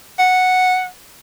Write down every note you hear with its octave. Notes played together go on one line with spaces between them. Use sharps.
F#5